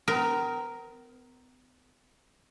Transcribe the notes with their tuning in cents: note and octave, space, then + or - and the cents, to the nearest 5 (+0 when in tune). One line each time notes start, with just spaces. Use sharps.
B3 +40 A#4 +0